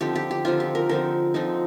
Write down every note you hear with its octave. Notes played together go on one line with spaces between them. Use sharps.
D3 F3 C4 D#4 G4
G4
G4
D3 F3 C4 D#4 F4
G4
A#4
D3 F3 C4 D#4 A#4
D3 F3 C4 D#4